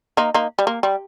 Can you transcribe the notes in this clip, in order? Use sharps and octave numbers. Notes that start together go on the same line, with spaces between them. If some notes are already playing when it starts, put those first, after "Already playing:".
A#3 D#4
A#3 D#4
G3
A#3
G3